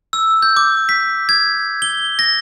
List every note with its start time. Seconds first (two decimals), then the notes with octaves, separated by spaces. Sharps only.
0.13 E6
0.42 G6
0.57 D6
0.89 B6
1.29 G#6
1.82 G7
2.19 A#6